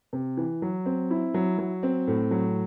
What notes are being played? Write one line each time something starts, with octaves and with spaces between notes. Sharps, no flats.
C3
E3
F#3
C4
E4
F#3
F#3
C4
A2
F#3